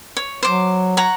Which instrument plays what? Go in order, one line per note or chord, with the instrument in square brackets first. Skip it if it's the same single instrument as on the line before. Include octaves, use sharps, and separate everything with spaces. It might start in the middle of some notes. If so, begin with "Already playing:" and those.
[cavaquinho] C#5
[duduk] F#3 [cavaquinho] C5 D6
[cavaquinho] C#5 F#5 A#5